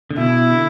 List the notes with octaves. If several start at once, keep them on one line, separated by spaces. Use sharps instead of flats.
D3
B2 E4
D3